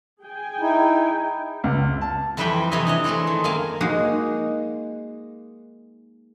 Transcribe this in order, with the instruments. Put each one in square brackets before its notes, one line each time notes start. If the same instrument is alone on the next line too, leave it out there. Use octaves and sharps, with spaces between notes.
[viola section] G#4 G5 G#5
[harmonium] D#4 E4
[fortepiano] C#2
A5
[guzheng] F2 E3 G3 B4 E5 G5
C3 E3 C#5 D#5 E5 G#5
D4 C#5 D#5
E3 G#3 A3 C4 E4
D#3
F#2 A#3 F5 G#5 A5
G#3 A#3 D#4 F#4